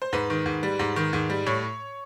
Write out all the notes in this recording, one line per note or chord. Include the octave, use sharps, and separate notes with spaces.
C5
G#2 B4
D#3
G#2
G3
G#2
D#3
G#2
G3
A2 C#5